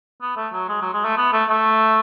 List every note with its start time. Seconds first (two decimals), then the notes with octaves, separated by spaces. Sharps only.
0.22 B3
0.37 A3
0.53 F#3
0.68 G#3
0.81 F#3
0.93 G#3
1.05 A3
1.17 B3
1.33 A3
1.49 A3